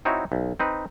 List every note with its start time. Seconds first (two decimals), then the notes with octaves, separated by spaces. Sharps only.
0.05 C4 D#4 E4 F#4 C#5
0.32 B1
0.60 C4 D#4 B4